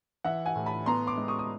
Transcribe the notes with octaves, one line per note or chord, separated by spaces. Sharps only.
E3 E5 F#5
F#5 G#5
A2
A5 B5
B3 A#5 C6
C6 D6
G#3
C#6 D#6
D#6